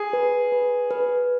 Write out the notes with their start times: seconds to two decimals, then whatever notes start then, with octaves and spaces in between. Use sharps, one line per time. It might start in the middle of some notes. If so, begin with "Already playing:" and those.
Already playing: G#4
0.13 B4
0.52 B4
0.91 B4